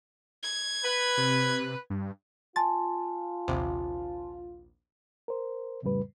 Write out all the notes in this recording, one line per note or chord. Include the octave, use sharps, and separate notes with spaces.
G#6
B4
C3
G2
F4 G#5 A5 C6 A6
A#1 D#2 C3
A#4 C5
C2 F2 A2 C#3 G3 B4